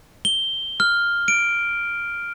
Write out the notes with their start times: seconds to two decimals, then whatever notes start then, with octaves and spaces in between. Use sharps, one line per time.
0.25 G7
0.80 F6
1.28 D7